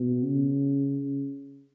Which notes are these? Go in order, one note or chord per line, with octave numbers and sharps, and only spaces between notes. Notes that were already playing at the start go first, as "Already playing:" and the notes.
Already playing: B2
C#3